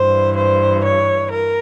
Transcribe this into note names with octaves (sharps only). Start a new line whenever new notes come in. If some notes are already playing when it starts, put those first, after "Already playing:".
Already playing: G2 E3 C5
C5
C#5
A#4